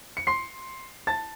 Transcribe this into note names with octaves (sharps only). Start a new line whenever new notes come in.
C#7
C6 C7
A5 A6